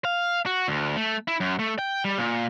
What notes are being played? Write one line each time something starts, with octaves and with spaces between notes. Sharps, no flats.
F5
F#4
D2
A3
E4
F#2
A3
G5
G3
A#2